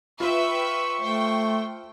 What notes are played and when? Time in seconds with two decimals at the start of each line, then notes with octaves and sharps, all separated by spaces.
0.20 F4 B4 E5 G5 C#6
1.01 A3 C5 G5